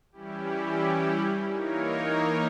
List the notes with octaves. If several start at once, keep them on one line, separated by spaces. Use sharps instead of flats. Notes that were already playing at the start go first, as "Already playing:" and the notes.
E3 G3 C#4 E4 G4
E3 A#3 D#4 A#4 C#5